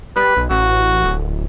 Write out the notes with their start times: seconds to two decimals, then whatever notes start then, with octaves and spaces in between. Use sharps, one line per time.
0.16 G3 B4
0.37 B1
0.50 A1 F#4
1.04 D1